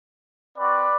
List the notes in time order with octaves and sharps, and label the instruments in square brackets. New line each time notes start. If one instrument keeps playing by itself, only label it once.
[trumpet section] C4 F#4 B4 D5